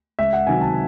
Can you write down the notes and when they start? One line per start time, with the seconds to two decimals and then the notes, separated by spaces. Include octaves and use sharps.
0.19 C#2 E5
0.33 F#5
0.47 C3 D#3 F#3 G#5
0.61 A5